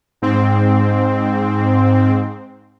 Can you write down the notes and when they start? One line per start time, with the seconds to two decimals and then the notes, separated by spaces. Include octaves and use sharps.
0.22 G#2 C4